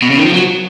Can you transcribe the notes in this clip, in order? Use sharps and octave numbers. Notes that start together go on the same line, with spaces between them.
B2
C#3
D#3
F3
F#3